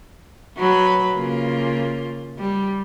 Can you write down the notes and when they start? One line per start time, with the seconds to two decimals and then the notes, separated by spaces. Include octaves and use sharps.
0.57 F#3 B4
1.15 C#3 A#3 F4
2.38 G3